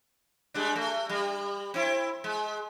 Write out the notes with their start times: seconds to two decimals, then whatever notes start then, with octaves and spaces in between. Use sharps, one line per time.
0.54 G3 G#3 D4
0.76 A3
1.09 G3
1.74 C4 E4
2.24 G#3